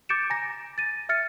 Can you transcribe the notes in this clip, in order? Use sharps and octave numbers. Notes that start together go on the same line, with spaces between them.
D6 G6 A6 C#7 D7 E7
G#5 A#5 A#6
A6 D#7
E5 F6 A6 C#7